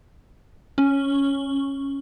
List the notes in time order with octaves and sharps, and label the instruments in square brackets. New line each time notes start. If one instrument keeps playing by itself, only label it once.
[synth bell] C#4